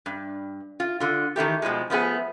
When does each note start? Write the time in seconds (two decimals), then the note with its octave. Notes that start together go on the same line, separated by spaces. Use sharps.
0.06 G2
0.80 F4
1.00 D3 F4
1.36 D#3 E3 A3 G4
1.62 B2 F3 G3 G#3
1.90 F3 A3 B3 G#4